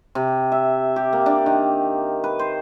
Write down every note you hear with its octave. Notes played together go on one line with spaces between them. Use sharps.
C3
E5
G4
A#3
D4
D#3
B4
C5